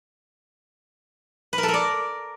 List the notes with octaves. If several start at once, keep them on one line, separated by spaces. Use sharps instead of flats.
B4
A#4
A4
A#4
D5